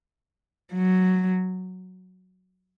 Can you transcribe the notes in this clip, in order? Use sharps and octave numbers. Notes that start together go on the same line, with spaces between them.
F#3